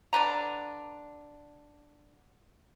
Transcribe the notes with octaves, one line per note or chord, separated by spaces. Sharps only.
D3 D4 B4 A#5